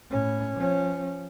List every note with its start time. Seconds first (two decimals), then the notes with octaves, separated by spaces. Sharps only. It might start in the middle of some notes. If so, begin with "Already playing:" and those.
0.10 A2 C#4
0.57 F3 C#4